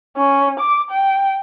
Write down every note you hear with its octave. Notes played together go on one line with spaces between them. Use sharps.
C#4
D6
G5